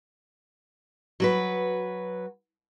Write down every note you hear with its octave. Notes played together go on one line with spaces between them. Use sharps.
F#3 F#4 B4